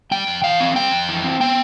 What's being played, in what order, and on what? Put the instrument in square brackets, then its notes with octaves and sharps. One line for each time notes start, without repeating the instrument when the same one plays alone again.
[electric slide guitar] G3 G5
F2
E3 F5
C4
G3 G5
F2
E3
C4
B3 G5